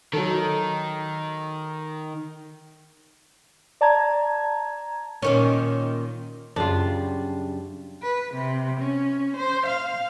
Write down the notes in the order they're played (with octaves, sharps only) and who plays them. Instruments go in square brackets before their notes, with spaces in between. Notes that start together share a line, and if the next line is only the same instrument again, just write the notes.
[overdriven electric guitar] D#3 [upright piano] F#3 A4
[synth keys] D5 A5 A#5 G#6
[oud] A#2 D#3 C#4
[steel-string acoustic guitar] F#2 C#3 G3 [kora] D4 F4
[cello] B4
C3
C#4
C5
F5